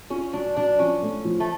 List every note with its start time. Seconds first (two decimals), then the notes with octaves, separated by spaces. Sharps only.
0.10 C#4 F4
0.33 F#3 D4
0.56 F#3 D4
0.79 F3 C#4
1.02 A3
1.25 F3
1.40 A3